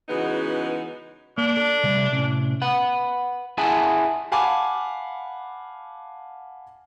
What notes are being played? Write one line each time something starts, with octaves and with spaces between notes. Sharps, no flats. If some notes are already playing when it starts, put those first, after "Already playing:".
C#3 E3 G#3 B3 D#4 F#4
A#3 D4
A4
C3 G3 A3
A2 C3 C#4
B4 F#5
E4 G#4 E5 F#5 G#5 A5
F5 F#5 G#5 A5 B5 D6